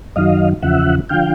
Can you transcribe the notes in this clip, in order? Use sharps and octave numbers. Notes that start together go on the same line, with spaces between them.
F#2 D#3 F#3 D#5 F5
E2 C#3 F3 E5 F#5
D3 F3 F5 G5